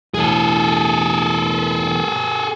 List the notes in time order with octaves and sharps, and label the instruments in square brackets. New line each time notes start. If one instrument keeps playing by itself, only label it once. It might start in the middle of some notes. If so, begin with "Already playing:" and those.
[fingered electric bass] E1 A2 [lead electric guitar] G#4 A4